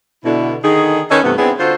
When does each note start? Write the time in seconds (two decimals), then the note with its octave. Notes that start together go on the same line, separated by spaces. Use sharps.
0.25 B2 D3 E4
0.64 D3 D#3 D#4 G#4
1.11 D#3 C#4 A4 B4 C#5 D#5
1.24 G2 C3 E3 A3 B3
1.38 B3 C4 D4 E4 G#4
1.59 D3 F4 F#4 A4 C5